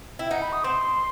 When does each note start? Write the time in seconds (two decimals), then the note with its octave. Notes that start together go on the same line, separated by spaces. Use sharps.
0.19 E4 G5
0.31 D#4 F#5
0.42 B5
0.53 D#6
0.64 C4 C6